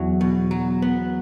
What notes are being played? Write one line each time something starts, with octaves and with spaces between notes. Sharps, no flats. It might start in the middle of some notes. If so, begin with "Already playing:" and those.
Already playing: E2 F#3
B2
F#3
B3